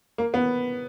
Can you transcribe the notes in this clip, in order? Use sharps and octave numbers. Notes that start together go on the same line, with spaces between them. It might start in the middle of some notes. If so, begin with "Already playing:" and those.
A#3
B3